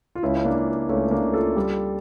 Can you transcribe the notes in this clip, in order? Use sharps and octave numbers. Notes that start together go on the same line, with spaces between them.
F4
C#2 C#4 E4
C#4
A#3 D4
C#2
C#2 A3 C#4
C#4
A#3 D4
C#2
F4 A4
G3